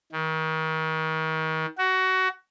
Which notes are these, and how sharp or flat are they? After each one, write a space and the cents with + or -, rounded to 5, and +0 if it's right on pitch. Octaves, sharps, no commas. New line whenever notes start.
D#3 +35
F#4 +20